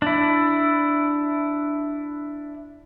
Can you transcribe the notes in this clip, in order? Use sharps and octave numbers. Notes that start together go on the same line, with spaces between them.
D4 E4